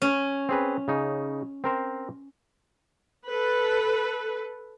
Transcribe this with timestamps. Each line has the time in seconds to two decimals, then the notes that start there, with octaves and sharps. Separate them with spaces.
0.02 C#4
0.49 C4 G#4 B4
0.88 C#3 D#4
1.64 C4 A#4 C5
3.28 A4 B4